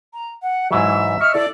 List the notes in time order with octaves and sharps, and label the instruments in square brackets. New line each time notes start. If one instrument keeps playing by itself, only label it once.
[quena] A#5
F#5
[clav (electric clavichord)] G#2 E3 F#3 [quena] E5
[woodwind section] D#5 C#6 F6
[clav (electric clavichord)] E4 [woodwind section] A4 D5